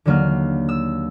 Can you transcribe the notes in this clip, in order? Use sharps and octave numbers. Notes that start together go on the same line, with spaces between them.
D#2 D3 F#3 A#3 F6
E6